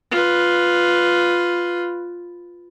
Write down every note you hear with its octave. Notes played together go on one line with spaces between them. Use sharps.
F4 B4